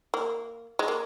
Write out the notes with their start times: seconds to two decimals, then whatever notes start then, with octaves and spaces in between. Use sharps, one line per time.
0.14 A#3
0.79 G#3
0.88 A#3